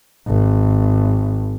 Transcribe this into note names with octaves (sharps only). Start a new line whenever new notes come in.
G#1